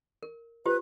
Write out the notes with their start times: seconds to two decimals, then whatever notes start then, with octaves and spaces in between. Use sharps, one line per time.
0.23 A#4
0.66 F4 G4 B4 C5